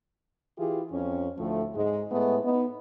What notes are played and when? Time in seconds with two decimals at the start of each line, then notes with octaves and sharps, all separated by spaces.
0.58 E3 E4 F4 G4 G#4
0.92 F2 C#4
1.38 D2 A2 F3 A3
1.76 G#2 G#3
2.12 A2 G#3 A3 B3
2.44 B3 D#4